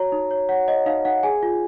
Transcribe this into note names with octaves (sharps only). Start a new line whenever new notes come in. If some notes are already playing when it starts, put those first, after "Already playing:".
Already playing: F#4 C#5 A#5
D#4
C#5
C#5 F#5
C#5 D#5
D#4 F5
D#4 F#5
G#4 G#5
F4